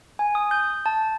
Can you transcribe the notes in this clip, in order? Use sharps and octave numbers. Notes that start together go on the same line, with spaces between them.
G#5
D#6
G6
A5